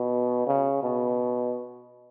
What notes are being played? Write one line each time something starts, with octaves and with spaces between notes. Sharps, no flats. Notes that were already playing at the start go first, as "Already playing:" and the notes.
Already playing: B2
C#3
B2